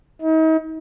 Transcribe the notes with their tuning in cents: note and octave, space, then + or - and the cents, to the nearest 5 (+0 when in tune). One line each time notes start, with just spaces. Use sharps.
D#4 +40